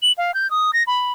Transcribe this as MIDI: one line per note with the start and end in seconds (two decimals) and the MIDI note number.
0.02 0.12 102
0.18 0.34 77
0.34 0.49 91
0.51 0.71 87
0.73 0.83 94
0.87 1.13 83